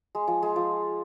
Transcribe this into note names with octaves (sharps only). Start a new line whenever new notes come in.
G#3
F3
G#3
F3